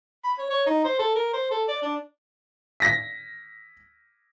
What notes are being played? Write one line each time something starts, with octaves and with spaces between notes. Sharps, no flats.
B5
C#5
C#5
D#4
C5
A4
A#4
C5
A4
D5
D4
A#6 B6